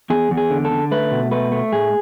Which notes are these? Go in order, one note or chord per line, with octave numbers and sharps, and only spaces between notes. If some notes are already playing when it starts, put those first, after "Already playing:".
E2 G#4
E2
G#4
D3
A4
D3
A3 B4
B2
A3 B4
A3
A2 G#4